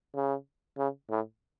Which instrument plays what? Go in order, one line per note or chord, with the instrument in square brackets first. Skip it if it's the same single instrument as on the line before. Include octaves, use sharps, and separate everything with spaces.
[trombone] C#3
C#3
A2